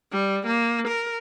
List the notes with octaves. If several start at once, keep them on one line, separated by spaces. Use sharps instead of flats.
G3
A#3
A#4